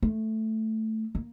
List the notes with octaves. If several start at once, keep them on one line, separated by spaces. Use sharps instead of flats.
A3
A#3